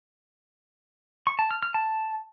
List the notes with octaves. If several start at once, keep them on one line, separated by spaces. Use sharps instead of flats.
C#6
A5
F6
F6
A5